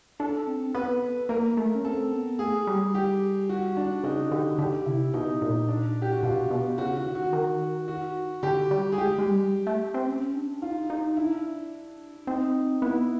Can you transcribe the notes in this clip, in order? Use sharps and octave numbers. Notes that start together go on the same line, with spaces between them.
D4 A4
C4
B3 B4
A#3 A#4
A3
C#4
C4 A4
B3
A3 G#4
G3
G4
F#4
D4
C#3 D#4
D3 G4
D3 G4
C3 E4
B2 D#4
A#2
D4
G4
F#4
B2 F4
B2
C#3 F#4
F#4
D#3
F#4
D#3
F#4
D3 G4
G3
G#4
G#3 G4
G#3
G3
A3
C4
C#4
D4
D#4 F4
D#4
D4 E4
C4 D#4
B3 E4